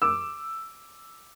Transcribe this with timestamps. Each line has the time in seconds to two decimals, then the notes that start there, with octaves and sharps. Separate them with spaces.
0.02 D6 E6